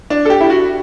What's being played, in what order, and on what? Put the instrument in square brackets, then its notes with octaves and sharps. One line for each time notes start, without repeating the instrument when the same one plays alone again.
[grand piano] D4
A4
G4
E4
F#4